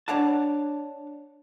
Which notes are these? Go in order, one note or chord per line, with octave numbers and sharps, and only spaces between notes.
D4 C#5 D5 F#5 A5